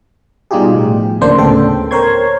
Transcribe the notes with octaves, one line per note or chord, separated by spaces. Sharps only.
B2 G3 D#4 F4 G4 G#4
A2 F3
D2 C#3 A#3 D4 C5
D2 A2 C#3 B3 A4 G5
A#4 C5 C#5 C6 G#6